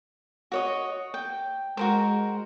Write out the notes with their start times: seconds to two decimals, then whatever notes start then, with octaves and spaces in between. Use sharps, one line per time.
0.52 F#4 C#5 D#5
1.14 G5
1.77 G#3 F#4 A#4 C5